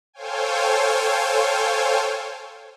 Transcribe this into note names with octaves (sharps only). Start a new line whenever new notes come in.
A4 C5 C#5 F5 G5 G#5